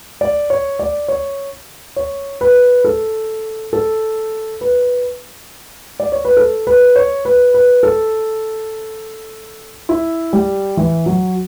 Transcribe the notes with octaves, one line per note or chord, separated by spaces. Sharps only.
D5
C#5
D5
C#5
C#5
B4
A4
A4
B4
D5
C#5
B4
A4
B4
C#5
B4
B4
A4
E4
G3
E3
F#3